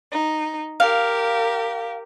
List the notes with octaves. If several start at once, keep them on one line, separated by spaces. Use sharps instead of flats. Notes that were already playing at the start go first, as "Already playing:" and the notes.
D#4
G4 A#4 F5